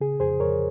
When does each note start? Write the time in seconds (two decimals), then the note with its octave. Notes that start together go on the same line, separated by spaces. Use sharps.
0.01 C#3 G#4
0.20 F2 G#4 C5
0.40 F2 A#4 C#5